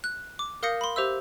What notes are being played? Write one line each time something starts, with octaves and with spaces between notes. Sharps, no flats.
F#6
D6
A#4 F5 D#6 G6 A#6 C#7
B5 C6
G4 C5 E5 E6